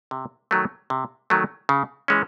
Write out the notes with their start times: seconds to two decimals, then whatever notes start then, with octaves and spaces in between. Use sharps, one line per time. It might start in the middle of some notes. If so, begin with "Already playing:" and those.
0.11 C3
0.51 D#3 F#3 A3
0.90 C3
1.30 D#3 F#3 A3
1.69 C#3
2.08 E3 G#3 C#4